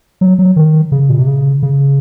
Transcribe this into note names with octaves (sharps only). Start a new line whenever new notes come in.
F#3
F#3
D#3
C#3
A#2
C3
C#3
C#3